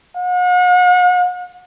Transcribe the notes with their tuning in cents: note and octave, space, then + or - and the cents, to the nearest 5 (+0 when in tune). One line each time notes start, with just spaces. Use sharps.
F#5 -40